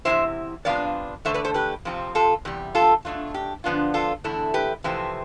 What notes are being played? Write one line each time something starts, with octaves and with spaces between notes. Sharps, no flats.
E2 C3 G3 C4 E4 C5 E5
C3 G3 B3 D4 F4 D5 F5
E2 D3 A3 C5 E5
B4 D5
A4 C5
G4 B4
F2 C3 F3 C4 F4
F4 A4
E2 C3 G3
F4 A4
B2 A3 D4 F4
G4
D3 F3 B3 D4 F4
F4 A4
E2 D3 A3 E4
G4 B4
F2 C3 E3 A3 C4